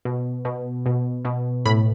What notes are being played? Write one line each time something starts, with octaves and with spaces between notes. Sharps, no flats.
B2
B2
B2
B2
A2 B5